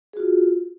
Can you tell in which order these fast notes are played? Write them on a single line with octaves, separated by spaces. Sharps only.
G#4 F#4 F4